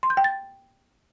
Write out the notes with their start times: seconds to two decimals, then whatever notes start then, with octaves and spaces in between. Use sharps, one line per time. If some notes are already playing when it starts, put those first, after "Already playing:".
0.03 C6
0.10 G6
0.17 G5
0.24 A6